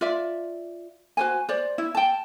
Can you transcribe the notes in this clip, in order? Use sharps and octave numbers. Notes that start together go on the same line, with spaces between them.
F4 D5 E5
F#4 C5 G#5
C5 D5
E4
G5 A5